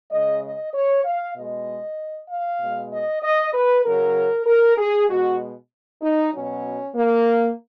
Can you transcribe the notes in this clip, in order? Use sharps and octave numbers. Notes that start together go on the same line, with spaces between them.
C#3 G#3 D#5
D#5
C#5
F5
B2 G#3 D#5
F5
B2 G#3
D#5
D#5
B4
C#3 F#3 A#4
A#4
G#4
B2 G#3 F#4
D#4
B2 F#3 C#4
A#3